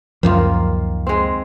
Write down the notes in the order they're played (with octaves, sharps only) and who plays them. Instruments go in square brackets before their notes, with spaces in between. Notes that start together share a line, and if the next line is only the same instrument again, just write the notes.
[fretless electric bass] C#2 F#2 F3 [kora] D#3 A#3 F4
[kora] G#3 C4